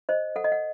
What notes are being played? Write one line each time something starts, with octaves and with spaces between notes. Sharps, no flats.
C5 D#5
A4 F#5
D#5
F#5